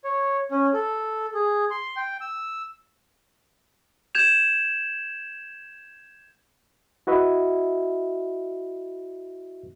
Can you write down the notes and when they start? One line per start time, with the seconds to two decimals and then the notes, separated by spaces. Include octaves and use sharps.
0.04 C#5
0.51 C#4
0.74 A4
1.35 G#4
1.71 C6
1.97 G5
2.21 E6
4.15 G6 G#6 E7 F7
7.07 E4 F#4 B4 D#5 E5